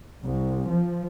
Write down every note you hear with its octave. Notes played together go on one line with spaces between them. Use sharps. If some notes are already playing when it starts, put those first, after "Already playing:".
C2
F3